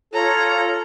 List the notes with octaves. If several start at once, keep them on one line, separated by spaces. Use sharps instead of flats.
F4 A4 C#5 A#5